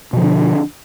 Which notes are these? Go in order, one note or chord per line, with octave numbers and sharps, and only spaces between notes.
B2 D3 F3 D4